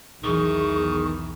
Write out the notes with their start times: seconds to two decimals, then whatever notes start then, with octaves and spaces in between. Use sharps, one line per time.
0.24 B1 E2 D#3 E3 G#4 C#6